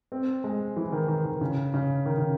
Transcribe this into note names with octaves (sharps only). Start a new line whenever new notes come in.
C4
G#3
E3
D#3
D#3
D#3
C#3
C#3
D#3
C#3